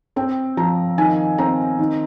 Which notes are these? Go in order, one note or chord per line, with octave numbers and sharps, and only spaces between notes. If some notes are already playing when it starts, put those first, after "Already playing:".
C4 G5
F3 A#5
D#3 G#5
C4 A#5
D#3